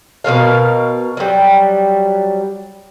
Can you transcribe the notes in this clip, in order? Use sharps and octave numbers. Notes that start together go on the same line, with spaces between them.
B2 F3 A#4 F5
F#3 G3